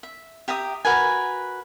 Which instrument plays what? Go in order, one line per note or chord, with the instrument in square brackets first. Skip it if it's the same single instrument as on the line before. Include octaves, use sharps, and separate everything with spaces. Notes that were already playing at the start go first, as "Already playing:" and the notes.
[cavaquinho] E5
G4 E5 A#5 D#6
F#4 A#4 B4 G#5